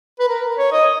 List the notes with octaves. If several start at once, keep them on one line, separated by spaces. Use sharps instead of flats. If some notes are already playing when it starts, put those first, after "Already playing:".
B4
A#4
C#5
D#5